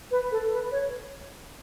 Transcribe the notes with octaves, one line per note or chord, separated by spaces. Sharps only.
B4
A4
B4
C#5